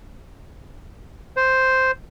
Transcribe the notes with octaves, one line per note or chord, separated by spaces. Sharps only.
C5